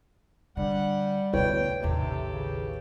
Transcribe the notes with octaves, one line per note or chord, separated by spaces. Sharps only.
D3 G3 F#5
D2 B2 E4 B4 C#5 G5
A1 D#2 C3 G4 A4
C#3